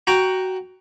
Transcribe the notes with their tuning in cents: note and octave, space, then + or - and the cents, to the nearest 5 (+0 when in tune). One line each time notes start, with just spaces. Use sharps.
F#4 +15 G5 +0 A#5 +0